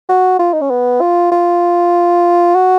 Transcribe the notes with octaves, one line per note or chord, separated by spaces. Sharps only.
F#4
F4
D#4
C#4
B3
F4
F4
F#4